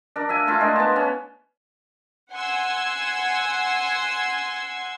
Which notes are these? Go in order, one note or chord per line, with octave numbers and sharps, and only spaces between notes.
D4 A#4
E5 F5 G#5
A3 E4 F4
G#3 D4 A#4
B3 A5
C#4
F#5 G#5 C6 E6 G#6